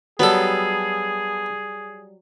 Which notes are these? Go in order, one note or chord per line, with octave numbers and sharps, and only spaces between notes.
F#3 G3 B3 G#4 A4